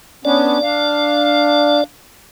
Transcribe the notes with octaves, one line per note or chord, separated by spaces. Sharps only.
B3 C#4 D4 D5
D4 F5